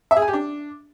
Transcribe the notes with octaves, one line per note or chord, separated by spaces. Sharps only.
E5
G#4
G#5
G4
D4